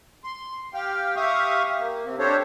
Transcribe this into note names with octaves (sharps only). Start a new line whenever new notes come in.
C6
G4 F5 G5
G4 E5 F5 C#6 D#6
A#3
C3 C4
D4 G4 A4 C5 C#5